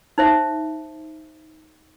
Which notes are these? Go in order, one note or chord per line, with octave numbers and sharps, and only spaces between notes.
D#4 C5 E5